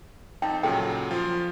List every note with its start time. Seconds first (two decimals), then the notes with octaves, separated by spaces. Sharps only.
0.42 F2 D#4 G5 A5
0.63 A#2 C#3 F#3 A4 G5
1.11 F3 F4